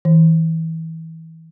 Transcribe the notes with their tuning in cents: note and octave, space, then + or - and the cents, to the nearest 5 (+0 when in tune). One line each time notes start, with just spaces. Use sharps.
E3 -25